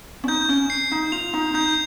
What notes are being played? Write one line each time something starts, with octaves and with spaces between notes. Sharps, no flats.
C#4
D#4 G6
C#4
C7
D#4
F4 F7
D#4
D#4 G6